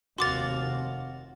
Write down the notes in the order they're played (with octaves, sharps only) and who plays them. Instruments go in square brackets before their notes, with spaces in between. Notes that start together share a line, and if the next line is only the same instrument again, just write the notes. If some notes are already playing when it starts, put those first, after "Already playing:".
[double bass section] F1 D#2 C3 [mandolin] F#4 F5 [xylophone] C6 D6 A6